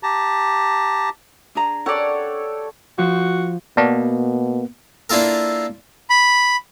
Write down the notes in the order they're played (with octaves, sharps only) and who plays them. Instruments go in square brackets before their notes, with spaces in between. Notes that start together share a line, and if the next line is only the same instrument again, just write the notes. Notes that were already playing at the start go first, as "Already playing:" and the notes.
[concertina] G4 A5 A#5
[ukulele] D4 G#4 A#5
[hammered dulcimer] G4 A4 C#5 [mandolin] D5 F#5
[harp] F3 G6 [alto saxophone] F#4
[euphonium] B2 [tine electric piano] A#3 B3 [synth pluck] D5 A5 C#6
[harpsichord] A#3 D4 E4 F4 A4 A#4
[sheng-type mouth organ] B5